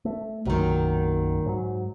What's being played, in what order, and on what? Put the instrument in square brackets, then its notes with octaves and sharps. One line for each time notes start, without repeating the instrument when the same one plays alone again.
[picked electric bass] A3
[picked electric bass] B1 F#2 F#3 [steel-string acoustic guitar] A#2 D#3
[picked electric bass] G#2 F#3